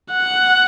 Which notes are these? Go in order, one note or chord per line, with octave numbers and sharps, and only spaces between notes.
F#5